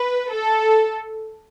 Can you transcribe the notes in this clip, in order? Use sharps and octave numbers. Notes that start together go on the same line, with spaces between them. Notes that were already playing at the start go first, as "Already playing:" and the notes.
Already playing: B4
A4